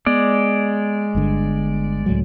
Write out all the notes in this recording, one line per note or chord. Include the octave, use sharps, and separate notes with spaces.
G#3 B3 D5
G1 G2 D3
C#2 A2 F#3